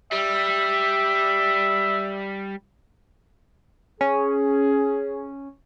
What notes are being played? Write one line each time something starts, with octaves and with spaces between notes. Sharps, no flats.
G3 E5
C#4 G#4